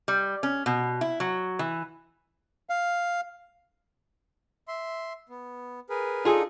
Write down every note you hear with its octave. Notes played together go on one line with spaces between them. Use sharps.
G3
C#4
B2
E4
F#3
E3
F5
E5 C6
B3
G#4 A#4 B4
D4 D#4 F4 G#4 A4